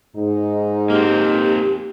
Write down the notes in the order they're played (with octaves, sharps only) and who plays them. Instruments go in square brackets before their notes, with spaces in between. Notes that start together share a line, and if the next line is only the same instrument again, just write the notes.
[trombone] G#2 [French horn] D#4
[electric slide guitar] A#3 C4 [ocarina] G4